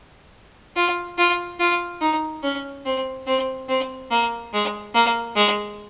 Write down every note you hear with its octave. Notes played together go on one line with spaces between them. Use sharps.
F4
F4
F4
D#4
C#4
C4
C4
C4
A#3
G#3
A#3
G#3